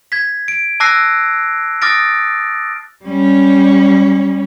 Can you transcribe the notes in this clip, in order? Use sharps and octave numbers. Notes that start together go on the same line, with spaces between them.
G#6 B6
D7
A5 D6 E6 F#6 A#6 C7
D6 D#6 F6 A6 A#6 D7
G3 C#4